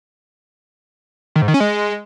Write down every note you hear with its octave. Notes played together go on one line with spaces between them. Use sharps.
D#3
G#2
D#3
C#4
G#3